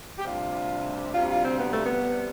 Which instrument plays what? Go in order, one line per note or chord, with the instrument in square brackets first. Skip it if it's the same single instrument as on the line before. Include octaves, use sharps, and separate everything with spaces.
[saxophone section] G4
D2 C3 G3 F4
D2 C3 G3 F4
F4
C4
B3
A3
B3
C3 G3